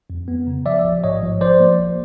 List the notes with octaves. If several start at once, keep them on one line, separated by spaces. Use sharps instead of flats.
F2
B3
C#3
F3 D5 E5
A1
G#2 C#5 D#5
F3
F3 C5 D5
A#3
A1